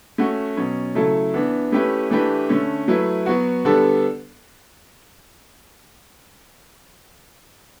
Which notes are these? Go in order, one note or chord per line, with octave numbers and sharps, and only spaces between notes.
A3 C#4 F#4
B2 F#3 C#4
C#3 F#3 A3 E4 A4
E3 B3 D4
A3 C#4 E4 G4 B4
E3 A3 D4 G4 B4
D3 A3 C#4
F#3 A3 E4 B4
F#3 B3 F#4
D3 G3 B3 D4 A4